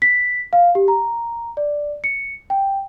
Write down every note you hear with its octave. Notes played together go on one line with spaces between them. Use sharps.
B6
F5
G4
A#5
D5
C#7
G5